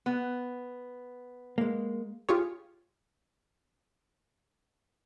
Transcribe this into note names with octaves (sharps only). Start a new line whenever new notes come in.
B3
G#3 A#3
F4 G4 G#4 C#5